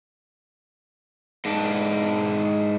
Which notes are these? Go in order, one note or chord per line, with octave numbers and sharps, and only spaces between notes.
G#2 D4